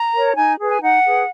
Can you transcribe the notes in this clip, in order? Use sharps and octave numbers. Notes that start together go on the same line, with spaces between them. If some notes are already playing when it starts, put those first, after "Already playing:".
Already playing: A#5
A#4 C#5
D#4 G#5
G#4 B4
G#5
D#4 F#5
G#4 B4